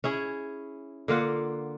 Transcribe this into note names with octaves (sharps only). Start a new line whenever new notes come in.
C#4 E4 G#4
D3 A#3 F4 F#5